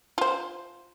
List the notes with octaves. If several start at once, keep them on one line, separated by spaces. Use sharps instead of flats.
F4 C5